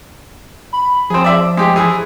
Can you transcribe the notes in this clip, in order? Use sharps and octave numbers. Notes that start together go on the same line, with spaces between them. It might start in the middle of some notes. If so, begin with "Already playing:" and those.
B5
F3 C4 G#4
D5 E5
G#3 G4
E3 G#4